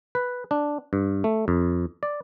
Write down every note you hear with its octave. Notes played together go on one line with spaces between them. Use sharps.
B4
D4
G2
A3
F2
D5